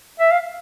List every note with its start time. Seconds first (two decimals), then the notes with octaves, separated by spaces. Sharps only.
0.20 E5
0.32 F5